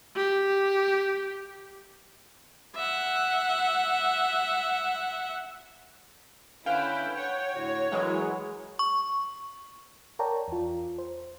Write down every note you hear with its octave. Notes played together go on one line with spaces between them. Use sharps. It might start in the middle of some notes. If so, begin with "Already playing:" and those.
G4
E5 F#5
D3 C#4 E4 B4 F5 G5
C#5 F#5
A2 D3 F#4
E3 F#3 G#3 A#4 B4
C#6
A#4 C#5 D5 G5 A5 A#5
E2 F4
C5